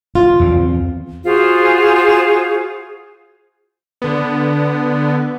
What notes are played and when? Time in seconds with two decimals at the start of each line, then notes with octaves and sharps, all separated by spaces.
0.15 F4
0.40 E2 A3 C4
1.25 F4 F#4 G#4 C5
4.02 D3 B3